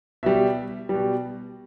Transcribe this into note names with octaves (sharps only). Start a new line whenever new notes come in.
B2 G3 E5
B2 G3